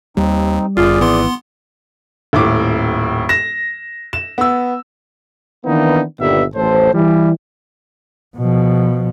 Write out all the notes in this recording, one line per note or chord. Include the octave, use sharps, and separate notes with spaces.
D#2 G3 C4 D#4
G1 F#2 F4 G#4 D5
G#1 E3 B3 C6
D#1 A2 D6
A#6 E7
E7
B3 E6
D#3 E3 A#3 B3 D4 D#4
G1 A#2 D#3 G3 B3 E5
A1 A2 A4 C5
E3 G3
B2 F3